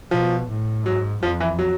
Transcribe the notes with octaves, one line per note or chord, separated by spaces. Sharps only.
B2 F3
A2
G#2 F#3
F2 F3
E3
F#3